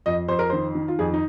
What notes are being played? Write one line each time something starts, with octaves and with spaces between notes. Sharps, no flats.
F2 D#5
F2 C5
A#4
D#3 C5
D#3
F4
F2 G#4
D#4